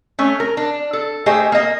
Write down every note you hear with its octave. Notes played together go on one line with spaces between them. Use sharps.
A3 C#4
A#4
D4
A4
A3 G4 G#4 C5 D#5
A#3 D#5